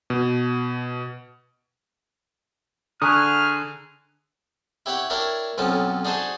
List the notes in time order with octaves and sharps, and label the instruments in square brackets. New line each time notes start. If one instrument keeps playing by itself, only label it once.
[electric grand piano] B2
[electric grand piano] D3 [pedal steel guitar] G#4 G#5 D#6 [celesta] A#5 C#6 F#6 [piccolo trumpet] F6
[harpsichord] E4 G4 C#5 F#5 G5 B5
D4 E4 A#4 C#5 D5 G5
B1 F2 F3 B3 C#4 A5
D4 D#4 F#4 G#4 C5 A5